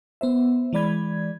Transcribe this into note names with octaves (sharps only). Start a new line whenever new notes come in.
B3 C5 E5
E3 G#3 D5 B5 G#6